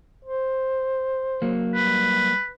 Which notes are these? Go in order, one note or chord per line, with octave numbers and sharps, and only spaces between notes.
C5
F#3 A#3
G3 B4